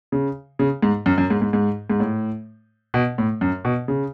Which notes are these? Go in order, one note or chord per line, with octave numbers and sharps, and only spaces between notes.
C#3
C#3
G#2
F#2
F#2
G#2
G#2
G#2
G#2
A2
B2
A2
F#2
B2
C#3